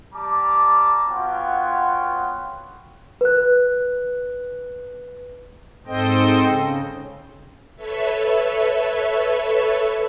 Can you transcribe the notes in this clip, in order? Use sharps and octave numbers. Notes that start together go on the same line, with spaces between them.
G3 A5 A#5 D6
B3 F4 F#4 C#5 G5
B4 F#6
G#2 C4 A4 C5 D#5 G5
C#3
A4 B4 C#5 E5